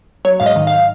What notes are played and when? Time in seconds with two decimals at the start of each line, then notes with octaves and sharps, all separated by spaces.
0.25 F#3 C#5
0.40 G#2 F5
0.46 D#5
0.56 D#3
0.67 F5